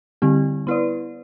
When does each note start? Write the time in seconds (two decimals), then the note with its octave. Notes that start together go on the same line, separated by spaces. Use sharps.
0.22 D3 G3 C4 E4 G4
0.67 B3 E4 B4 D5